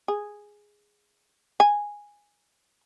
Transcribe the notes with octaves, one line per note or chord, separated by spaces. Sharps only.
G#4
G#5